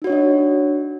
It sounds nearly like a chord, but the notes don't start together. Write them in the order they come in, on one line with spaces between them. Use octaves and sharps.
D#4 F#4 C#5 D4 D#5